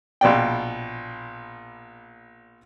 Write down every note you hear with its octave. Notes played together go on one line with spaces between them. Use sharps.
A#1 B2 D5 G5